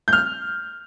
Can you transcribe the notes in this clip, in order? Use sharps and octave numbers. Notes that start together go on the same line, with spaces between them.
G6
F6
G6